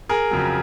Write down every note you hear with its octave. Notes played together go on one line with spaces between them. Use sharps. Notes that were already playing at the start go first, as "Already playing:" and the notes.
G#4 A#4
F2 C#3 F#3